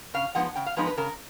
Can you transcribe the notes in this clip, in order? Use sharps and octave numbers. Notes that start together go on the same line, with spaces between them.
C#3 F5
F3 G#3 B3 D#4 F#5
C#3 G5
F5
F3 G#3 B3 D#4 B4
B4
C#3 A#4